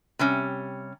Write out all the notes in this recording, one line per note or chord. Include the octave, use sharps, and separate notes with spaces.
C3 G3 C#4